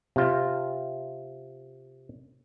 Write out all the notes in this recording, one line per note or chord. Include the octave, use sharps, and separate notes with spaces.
C3 F4